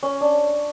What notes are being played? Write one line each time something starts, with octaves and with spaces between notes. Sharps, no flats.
C#4
D4